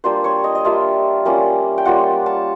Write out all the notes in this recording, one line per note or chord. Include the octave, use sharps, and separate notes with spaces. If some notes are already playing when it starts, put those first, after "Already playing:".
G3 A#3 D4 F4 C5
C#5
D#5
D#5
G3 A#3 D4 F4 E5
G3 A#3 C#4 F4
G5
G3 A#3 C#4 F4 F#5
A5